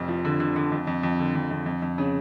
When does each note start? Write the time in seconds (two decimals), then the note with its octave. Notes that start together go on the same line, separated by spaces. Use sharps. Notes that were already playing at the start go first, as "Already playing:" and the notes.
Already playing: F1 F2
0.08 F3
0.25 D3
0.40 D3
0.56 D3
0.72 F2
0.87 F2
1.03 F2
1.19 D3
1.35 F2
1.51 F2
1.66 F2
1.82 F2
1.98 C#3